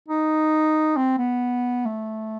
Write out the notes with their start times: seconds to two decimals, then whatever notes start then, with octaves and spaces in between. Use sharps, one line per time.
0.08 D#4
0.96 C4
1.18 B3
1.85 A3